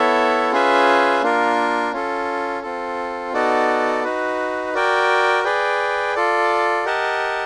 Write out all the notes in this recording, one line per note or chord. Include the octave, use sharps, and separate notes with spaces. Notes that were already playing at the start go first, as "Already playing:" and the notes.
Already playing: B3 E4 A4 C#5 E5
C#4 F4 G#4 B4 E5
A#3 D4 F4 A#4
C#4 F4 A4
C4 F4 A4
B3 D#4 F#4 A4 D5
D#4 F#4 B4
F#4 A#4 D5 G5
G#4 B4 D5 G5
F4 A4 D5
G4 A#4 D#5 F#5 A5